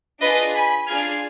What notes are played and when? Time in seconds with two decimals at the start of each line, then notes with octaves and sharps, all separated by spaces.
0.21 D4 F4 G#4 B4 D#5
0.54 G#5 B5
0.87 D4 F4 G#4 F6 G#6